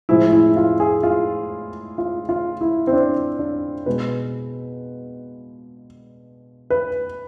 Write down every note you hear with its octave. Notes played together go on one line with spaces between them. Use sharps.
A2 F3 G#3 E4
E4
F4
G#4
F4
F4
F4
E4
C4
D4
D4
B2 G#3 B4
B4